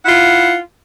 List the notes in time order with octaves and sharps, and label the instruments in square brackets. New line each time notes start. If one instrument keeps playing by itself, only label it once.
[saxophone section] E4 F4 F#5